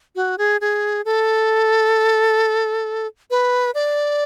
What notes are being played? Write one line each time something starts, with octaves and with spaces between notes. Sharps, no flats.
F#4
G#4
G#4
A4
B4
D5